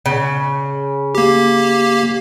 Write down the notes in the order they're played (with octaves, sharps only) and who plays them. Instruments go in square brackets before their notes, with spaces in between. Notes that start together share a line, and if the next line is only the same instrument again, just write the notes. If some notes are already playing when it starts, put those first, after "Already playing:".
[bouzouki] C#3
[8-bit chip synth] A#3 G4